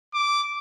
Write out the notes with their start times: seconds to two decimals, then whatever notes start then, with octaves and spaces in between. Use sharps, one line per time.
0.14 D6